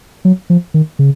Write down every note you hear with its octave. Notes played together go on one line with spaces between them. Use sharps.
F#3
F3
D#3
C#3